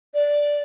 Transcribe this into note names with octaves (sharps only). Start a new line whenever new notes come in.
D5